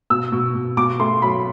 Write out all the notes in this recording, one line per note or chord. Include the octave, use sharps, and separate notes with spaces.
B2 E6
B2
B2
B2 D6
A3 C6
F#3 B5